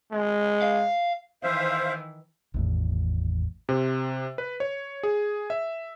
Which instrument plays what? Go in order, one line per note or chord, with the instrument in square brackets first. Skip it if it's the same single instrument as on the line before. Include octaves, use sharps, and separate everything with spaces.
[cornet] G#3
[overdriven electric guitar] F5
[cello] D#3 E3 [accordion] C5 E5 F5
[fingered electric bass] G#1 E2 A2
[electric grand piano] C3
B4
C#5
G#4
E5